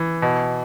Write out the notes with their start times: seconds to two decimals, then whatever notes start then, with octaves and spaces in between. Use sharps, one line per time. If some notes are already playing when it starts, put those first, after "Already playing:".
Already playing: E3
0.22 B2